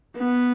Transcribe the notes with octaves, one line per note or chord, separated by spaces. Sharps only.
B3